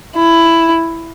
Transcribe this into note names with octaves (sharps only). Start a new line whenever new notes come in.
E4